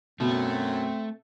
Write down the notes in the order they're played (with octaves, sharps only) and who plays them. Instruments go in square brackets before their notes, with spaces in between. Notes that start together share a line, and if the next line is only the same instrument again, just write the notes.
[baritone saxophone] F#2 [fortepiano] B2 [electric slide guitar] A3 [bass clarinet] C4